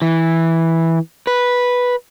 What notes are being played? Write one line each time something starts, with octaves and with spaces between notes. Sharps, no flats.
E3
B4